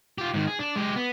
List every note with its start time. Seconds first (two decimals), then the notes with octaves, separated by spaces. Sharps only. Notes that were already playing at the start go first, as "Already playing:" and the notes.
0.18 F4 G4
0.34 G#2 D#3
0.47 G#4
0.59 D4
0.76 G#3 G4
0.96 B3